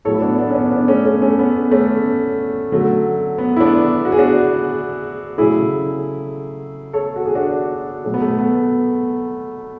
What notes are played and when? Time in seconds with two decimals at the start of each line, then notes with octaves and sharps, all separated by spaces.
0.05 A2 F#3 A3 A4 C#5
0.14 E4
0.21 B3 D4
0.38 B3 D4
0.50 C#4
0.55 B3 D4
0.71 B3 D4
0.88 A3 C#4
1.05 A3 C#4
1.22 A3 C#4
1.39 B3
1.71 A3 C#4
2.72 D3 F#3 A3
3.38 B3
3.56 E4
3.60 B3 D4
4.05 F#4
4.12 G#4
4.19 D4 F#4
5.38 C#3 F#3 A3 E4 G#4
6.93 A4 C#5
7.16 F#4
7.26 G#4
7.35 D4 F#4
8.04 B2 F#3 A3
8.14 B3
8.21 A3
8.38 B3